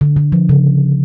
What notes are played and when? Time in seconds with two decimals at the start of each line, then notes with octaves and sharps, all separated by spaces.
0.01 D3
0.16 D3
0.32 F3
0.49 C#3